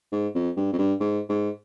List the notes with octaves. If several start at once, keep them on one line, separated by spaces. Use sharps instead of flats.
G#2
F2
G2
F2
G2
G#2
G#2